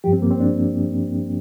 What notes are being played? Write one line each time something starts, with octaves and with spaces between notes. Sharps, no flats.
G2 F3 G4
C4
A#3
C4
D4